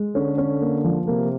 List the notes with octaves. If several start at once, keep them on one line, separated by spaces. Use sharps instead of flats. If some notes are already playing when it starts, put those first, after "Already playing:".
Already playing: G#3
D3 C#4
C#4
A#3
F3
C3 A#3